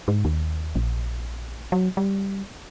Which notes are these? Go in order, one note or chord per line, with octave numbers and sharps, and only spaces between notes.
G#2
D#2
A#1
F#3
G3